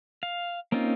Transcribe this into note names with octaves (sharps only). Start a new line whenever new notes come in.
F5
A#3 C4 C#4 D#4 F4